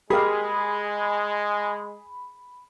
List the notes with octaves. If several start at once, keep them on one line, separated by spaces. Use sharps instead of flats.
G#3 G4 G#4 A#4 F5 B5